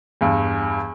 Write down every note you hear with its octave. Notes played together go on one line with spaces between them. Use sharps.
E2 G2